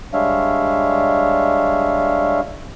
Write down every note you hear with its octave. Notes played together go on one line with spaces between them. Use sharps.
G3 G#3 D4 C#5 E5 F5